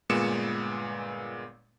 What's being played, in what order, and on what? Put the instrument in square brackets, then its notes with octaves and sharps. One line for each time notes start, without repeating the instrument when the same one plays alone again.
[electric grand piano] G1 A#2 G#3 B3 C#7 E7